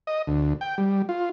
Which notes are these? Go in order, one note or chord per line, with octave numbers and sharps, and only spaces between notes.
D#5
D2
G5
G3
F4